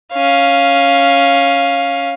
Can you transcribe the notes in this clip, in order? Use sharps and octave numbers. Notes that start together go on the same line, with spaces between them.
C#4 F5